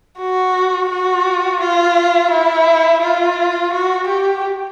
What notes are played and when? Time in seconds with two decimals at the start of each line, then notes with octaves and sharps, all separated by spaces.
0.19 F#4
0.89 F#4
1.61 F4
2.31 E4
3.02 F4
3.73 F#4
4.07 G4